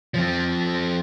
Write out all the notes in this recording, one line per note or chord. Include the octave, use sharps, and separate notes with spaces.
F3 C4